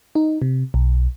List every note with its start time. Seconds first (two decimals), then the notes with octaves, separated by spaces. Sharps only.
0.15 D#4
0.42 C3
0.74 B1